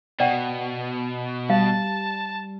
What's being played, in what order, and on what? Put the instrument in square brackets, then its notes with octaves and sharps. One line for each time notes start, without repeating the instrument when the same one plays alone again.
[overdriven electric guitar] B2 [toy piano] D5 F#5 G5
[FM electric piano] G3 [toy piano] F5 [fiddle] A5